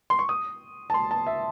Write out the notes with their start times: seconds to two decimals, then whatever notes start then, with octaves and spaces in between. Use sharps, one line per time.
0.10 C6
0.19 C#6
0.29 D#6
0.90 A5
0.94 C6
1.11 A5
1.27 E5